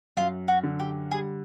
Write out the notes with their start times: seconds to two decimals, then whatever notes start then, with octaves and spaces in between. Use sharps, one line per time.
0.17 F#2 F4
0.48 F#4
0.63 D3
0.80 G4
1.11 G3 G#4